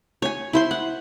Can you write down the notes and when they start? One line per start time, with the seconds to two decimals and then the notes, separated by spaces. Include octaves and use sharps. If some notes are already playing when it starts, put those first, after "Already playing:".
0.22 C#5 G#5
0.53 E4 C5 C6
0.71 F#5